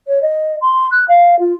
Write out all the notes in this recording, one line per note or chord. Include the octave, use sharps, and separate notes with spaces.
C#5
D#5
C6
F#6
F5
F4